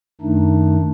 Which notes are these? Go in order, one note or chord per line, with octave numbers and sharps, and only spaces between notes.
F#2 D#3 A3 D4 D#4